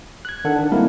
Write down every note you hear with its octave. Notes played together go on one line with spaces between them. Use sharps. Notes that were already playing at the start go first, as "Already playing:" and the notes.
F#6 G#6
D#3 D4 A4 F#5
D#3 D4
G3 G#3 A#3 C4 E4 A#4